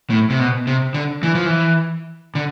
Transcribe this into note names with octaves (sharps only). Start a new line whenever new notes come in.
A2
C3
B2
C3
D3
E3
F3
E3
D3